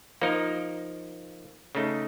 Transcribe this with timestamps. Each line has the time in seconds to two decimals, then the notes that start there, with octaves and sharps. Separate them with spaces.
0.21 F3 A#3 D#4 A#4
1.75 C#3 A3 D#4